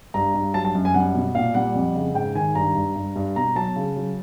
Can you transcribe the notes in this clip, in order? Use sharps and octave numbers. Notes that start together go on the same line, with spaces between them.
G2 A#5
G2
F#3 A5
A5
F#2
G#5
G3 F#5
B2
A#2 F5
G3 F#5
F2
C#3
G#2 G5
D#3 G#5
G2 A#5
G2
G2
G2
B2 A#5
F#3 A5
C#3
F#3